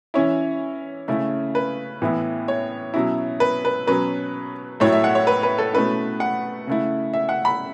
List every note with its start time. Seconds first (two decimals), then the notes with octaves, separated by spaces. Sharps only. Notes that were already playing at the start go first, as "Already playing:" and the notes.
0.14 E3 C#4 E4 C#5
1.08 C#3 A3 C#4 E4
1.55 B4
2.02 A2 E3 B3 E4
2.48 C#5
2.94 B2 F#3 C#4 E4
3.40 B4
3.65 B4
3.87 B2 F#3 C#4 B4
4.80 A2 F#3 A3 E4 C#5
4.93 E5
5.04 F#5
5.15 C#5
5.27 B4
5.43 B4
5.58 A4
5.73 B2 A3 C#4 E4 B4
6.20 F#5
6.67 C#3 A3 E4
7.14 E5
7.29 F#5
7.45 B5